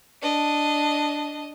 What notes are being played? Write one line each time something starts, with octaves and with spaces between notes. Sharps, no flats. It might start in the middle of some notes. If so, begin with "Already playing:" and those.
D4 D#5